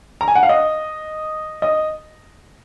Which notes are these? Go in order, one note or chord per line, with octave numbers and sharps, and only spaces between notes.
A#5
G#5
F#5
F5
D#5
D#5